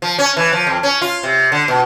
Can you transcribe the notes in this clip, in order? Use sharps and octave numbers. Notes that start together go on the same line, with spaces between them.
F3
C#4
E3
F3
F2
C#4
F4
C3
D3
B2